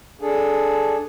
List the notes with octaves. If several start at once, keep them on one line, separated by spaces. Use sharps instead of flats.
D4 G#4 A4